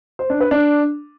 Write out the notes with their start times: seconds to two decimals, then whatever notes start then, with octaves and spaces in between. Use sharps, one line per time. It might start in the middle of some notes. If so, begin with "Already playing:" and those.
0.19 C5
0.30 D4
0.41 B4
0.51 D4